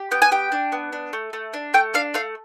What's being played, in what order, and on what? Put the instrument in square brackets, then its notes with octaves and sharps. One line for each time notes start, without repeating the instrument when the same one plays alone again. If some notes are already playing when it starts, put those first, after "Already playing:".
Already playing: [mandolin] G4
B3 G5
G#5
G4 G5
D4
B3
D4
A3
A3
D4
A3 G5
D4 F5
A3 F5